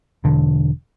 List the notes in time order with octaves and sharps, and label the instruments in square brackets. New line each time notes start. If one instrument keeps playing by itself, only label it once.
[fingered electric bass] E1 D3